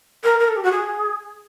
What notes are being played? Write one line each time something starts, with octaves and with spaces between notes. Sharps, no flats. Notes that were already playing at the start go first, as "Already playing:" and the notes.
A#4
A#4
A4
G4
F#4
G#4